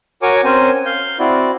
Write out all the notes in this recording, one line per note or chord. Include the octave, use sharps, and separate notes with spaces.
F#4 A#4 C#5 G#5 C#6 D6
C4 C#4 A#4 C5 G#5
F5 G6
C4 E4 F#4 D5